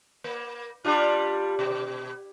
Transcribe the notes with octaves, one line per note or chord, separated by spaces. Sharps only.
A#3
G3 D4 F4
B2